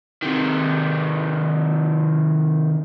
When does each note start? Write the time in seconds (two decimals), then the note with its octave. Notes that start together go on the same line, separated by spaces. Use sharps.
0.23 C3 D#3